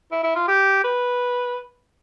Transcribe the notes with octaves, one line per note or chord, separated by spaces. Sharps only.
E4
E4
F4
G4
B4